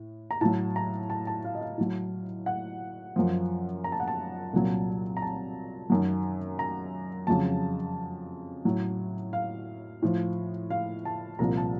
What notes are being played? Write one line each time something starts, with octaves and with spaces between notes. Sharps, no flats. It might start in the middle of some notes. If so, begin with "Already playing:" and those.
Already playing: A2
A#5
A2 F#3 A5
A#5
A5
A5
F5
D#5
F5
A2 F#3
F#5
F#2 F3
A#5
A5
F#5
A5
C2 A#2 F#3
A#5
A5
F#2 D#3 F#3
A#5
F2 C#3 F#3 A5
A2 F#3
F5
A2 F3
F5
A5
C2 A#2 F3 A#5
A5